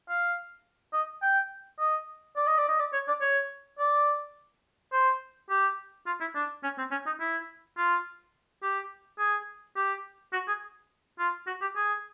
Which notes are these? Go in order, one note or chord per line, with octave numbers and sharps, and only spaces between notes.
F5
D#5
G5
D#5
D5
D#5
D5
D#5
D5
C#5
D5
C#5
D5
C5
G4
F4
E4
D4
C#4
C4
C#4
D#4
E4
F4
G4
G#4
G4
F#4
G#4
F4
F#4
G4
G#4